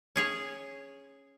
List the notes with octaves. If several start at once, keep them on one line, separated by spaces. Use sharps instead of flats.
C#4 G#4 C#5